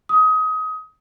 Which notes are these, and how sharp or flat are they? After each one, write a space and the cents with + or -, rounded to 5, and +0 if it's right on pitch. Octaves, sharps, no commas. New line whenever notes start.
D#6 +25